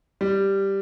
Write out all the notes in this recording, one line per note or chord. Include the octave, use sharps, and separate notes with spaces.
G3